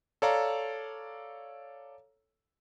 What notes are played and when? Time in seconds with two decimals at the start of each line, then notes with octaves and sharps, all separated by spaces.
0.22 A4 C#5 D5 F5 A#5